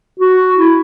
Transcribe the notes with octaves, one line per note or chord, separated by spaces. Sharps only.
F#4
E4